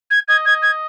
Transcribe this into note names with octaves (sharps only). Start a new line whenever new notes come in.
G#6
D#5 G#6
D#5 G#6
G#6